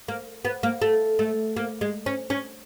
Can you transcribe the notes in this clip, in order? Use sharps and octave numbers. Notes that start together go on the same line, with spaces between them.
A#3
B3
A#3
A3
A3
A#3
G#3
C#4
C#4